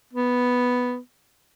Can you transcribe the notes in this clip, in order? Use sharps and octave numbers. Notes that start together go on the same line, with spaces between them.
B3